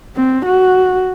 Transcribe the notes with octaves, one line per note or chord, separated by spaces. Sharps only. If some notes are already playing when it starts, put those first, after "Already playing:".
C4
F#4